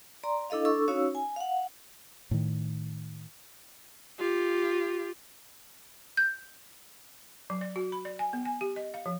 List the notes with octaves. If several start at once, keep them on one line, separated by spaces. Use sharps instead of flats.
D5 A#5 C6
D4 E4 A4 D#5 F5
D4 A4 C#6 E6
C#4 D#4 F#4 C#5 F5 E6
G#5
F5 F#5
A2 D#3
F4 G4
G6
F#3
D5
F#4
B5
D5
G#5
B3
G#5
G4
D#5
F5
F3